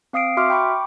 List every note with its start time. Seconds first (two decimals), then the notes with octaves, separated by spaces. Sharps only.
0.13 C4 F5 D#6 C7 D7
0.37 F#4 E5 C6 D6 F6
0.50 G5 B5 C#6 D6